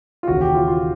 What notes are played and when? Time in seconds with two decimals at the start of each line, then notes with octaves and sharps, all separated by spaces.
0.23 F4
0.28 E1 D#2 C#3 E3 F#4
0.41 G4
0.55 F4
0.68 F4